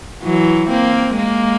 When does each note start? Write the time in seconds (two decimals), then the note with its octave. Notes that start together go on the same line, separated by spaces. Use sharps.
0.23 E3 F#3
0.70 A#3 C4
1.16 G#3 A#3